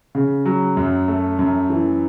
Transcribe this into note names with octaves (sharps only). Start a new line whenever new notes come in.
C#3
F#3
F#2
A3
F#2
E3